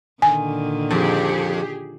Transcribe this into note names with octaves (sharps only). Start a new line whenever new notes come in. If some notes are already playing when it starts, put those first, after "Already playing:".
A#2 D3 D#3 G#5
F2 G4 G#4